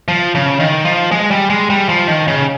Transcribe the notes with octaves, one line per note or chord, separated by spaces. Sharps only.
F3
C#3
D#3
F3
G#3
G3
G#3
G3
F3
D#3
C#3